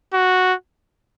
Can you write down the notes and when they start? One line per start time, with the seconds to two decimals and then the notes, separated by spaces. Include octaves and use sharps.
0.14 F#4